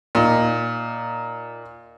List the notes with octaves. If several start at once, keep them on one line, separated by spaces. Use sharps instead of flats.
A#2 D#4